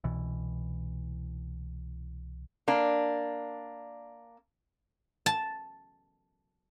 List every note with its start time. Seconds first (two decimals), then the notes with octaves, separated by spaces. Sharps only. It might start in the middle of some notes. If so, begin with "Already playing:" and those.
0.04 C2 B2 E3
2.68 A#3 D4
5.26 A5